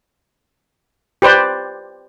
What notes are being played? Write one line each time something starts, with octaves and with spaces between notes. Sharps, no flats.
G4 B4 C5 D5